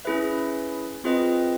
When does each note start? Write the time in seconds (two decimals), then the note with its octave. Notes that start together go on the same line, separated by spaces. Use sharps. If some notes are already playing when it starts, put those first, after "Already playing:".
0.05 C#4 E4 G#4 B4 E5
1.04 C4 F4 G#4 B4 D#5